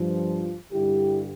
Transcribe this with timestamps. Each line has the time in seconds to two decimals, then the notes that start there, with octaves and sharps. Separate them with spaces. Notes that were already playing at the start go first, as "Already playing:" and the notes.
Already playing: G2 F3
0.72 G2 D3 G3 E4 G4